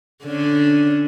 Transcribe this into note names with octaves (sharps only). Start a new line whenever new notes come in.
D3 C#4 D4